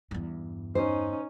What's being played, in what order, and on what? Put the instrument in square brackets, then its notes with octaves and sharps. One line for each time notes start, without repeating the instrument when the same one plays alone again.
[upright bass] E2 G2
[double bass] C#4 D#4 [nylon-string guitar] C5